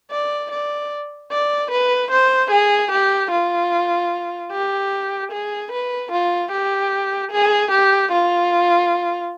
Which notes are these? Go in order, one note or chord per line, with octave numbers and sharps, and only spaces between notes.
D5
D5
D5
B4
C5
G#4
G4
F4
G4
G#4
B4
F4
G4
G#4
G4
F4